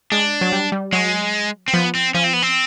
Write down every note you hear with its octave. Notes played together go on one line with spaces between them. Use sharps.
G#3 D4
F#3
G3
G3
F#3 G#3
C4
F3 B3
C4
F3 C#4
C4
B3
C4